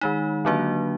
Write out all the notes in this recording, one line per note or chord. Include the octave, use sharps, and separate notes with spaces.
D#3 G#3 D#4
D3 F#3 A#3 D4 F#4